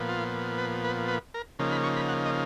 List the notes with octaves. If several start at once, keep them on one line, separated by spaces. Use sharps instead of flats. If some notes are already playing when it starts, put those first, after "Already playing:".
Already playing: A#2 F3 B3
F4
B4
B4
B4
A#4
C#3 F3 A#3 D#4
B5
C#6
B5
F#5
D#5